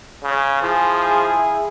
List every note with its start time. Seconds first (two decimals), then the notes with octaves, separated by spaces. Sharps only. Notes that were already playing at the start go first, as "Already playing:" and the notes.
0.24 C#3
0.62 F3 E4 G#4